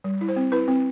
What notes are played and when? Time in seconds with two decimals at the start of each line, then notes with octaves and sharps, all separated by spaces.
0.04 G3
0.21 E4
0.28 C5
0.36 C4
0.52 E4 B4
0.68 C4